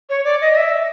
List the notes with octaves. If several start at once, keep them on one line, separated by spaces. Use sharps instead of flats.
C#5
D5
D#5
D#5
E5